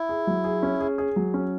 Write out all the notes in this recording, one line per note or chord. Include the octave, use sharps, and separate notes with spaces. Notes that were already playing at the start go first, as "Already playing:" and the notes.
Already playing: E4
G#4
F#3
G#4
C#4
G#4
G#4
F#3
C#4